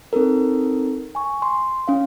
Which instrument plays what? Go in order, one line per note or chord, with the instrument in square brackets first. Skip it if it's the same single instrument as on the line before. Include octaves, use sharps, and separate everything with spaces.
[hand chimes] C4 D#4 A4 A#4
G#5 C#6
C6
C#4 F5